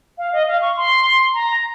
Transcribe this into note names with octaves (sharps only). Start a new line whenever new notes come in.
F5
D#5
F5
C#6
C6
A#5